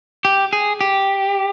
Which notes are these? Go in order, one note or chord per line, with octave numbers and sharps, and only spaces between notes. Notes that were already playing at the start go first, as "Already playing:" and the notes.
G4
G#4
G4